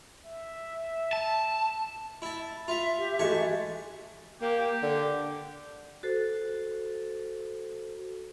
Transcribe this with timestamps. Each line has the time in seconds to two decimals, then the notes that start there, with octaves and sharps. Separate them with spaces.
0.26 E5
1.13 A5
2.22 E4 A5
2.68 F4 E5 F5
2.98 G4
3.19 E3 G#3 A3 F#4 G#5 A5 C#6
4.42 A#3 G4
4.60 G4
4.83 D3
6.03 F#4 A4 C5